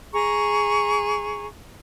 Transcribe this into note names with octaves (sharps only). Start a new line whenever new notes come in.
G#4 A#5 C#6